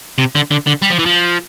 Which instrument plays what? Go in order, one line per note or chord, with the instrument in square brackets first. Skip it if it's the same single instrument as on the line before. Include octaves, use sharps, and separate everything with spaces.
[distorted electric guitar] C3
D3
D3
D3
G3
F3
E3
F3